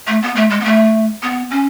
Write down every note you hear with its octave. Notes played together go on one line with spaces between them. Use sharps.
A3
B3
A3
G#3
B3
A3
B3
C#4